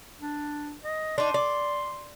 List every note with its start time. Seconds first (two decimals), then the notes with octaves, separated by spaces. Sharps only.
0.21 D4
0.84 D#5
1.18 D4 D#4 C6
1.34 D5